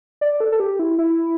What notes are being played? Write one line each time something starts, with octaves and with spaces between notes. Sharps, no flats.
D5
A4
A4
G4
E4
E4